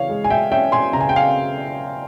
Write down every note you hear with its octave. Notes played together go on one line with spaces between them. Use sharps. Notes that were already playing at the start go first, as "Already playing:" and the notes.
Already playing: C#3 E3 C#5 F5
G#3
G#5
E5 G5
C#4 E5 G5
G#5 C6
C#3 A#5
G#5
G5
F5 G#5